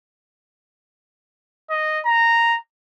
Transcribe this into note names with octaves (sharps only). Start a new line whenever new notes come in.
D#5
A#5